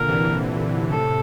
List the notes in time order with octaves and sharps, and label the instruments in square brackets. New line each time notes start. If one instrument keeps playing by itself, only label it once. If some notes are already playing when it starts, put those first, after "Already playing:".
Already playing: [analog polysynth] A#2 D3 [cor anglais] A#4
[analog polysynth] C3 E3
A#2 D3
[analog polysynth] A2 C3 [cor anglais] A4